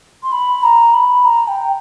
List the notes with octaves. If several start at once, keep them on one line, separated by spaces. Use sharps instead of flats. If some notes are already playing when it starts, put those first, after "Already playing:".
C6
B5
A#5
B5
A#5
G5